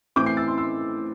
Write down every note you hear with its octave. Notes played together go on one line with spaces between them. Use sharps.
A2 E3 C4 D6 G6
G6 C7
E6 A6
C6 E6
C6 E6